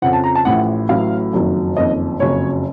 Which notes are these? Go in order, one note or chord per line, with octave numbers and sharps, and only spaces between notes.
F2 C#3 F3 F#5
A5
A#5
A5
A1 A2 F3 F#5
A1 A2 F#3 F5
F#1 F2 D#3 F#3
F#1 F2 D#3 D#5
F#1 F2 C#3 F#3 C#5